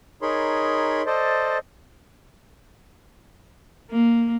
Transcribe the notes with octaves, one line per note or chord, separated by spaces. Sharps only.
D#4 G#4 A#4 C#5 B5 C6
A4 C5 D5 D#5
A#3